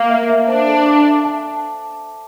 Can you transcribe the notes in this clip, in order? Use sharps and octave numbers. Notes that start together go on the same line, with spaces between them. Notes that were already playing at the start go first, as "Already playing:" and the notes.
Already playing: A#3 F5
E5
E5
D4 C5
A4
D6
E5
A5